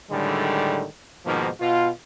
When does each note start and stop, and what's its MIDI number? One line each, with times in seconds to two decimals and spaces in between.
0.11 0.86 45
0.11 0.86 50
0.11 0.86 51
0.11 0.86 55
0.11 0.86 56
1.26 1.50 44
1.26 1.50 47
1.26 1.50 51
1.26 1.50 53
1.26 1.50 58
1.60 1.89 47
1.60 1.89 65